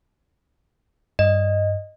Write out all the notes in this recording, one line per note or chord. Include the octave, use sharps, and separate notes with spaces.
G2 D#5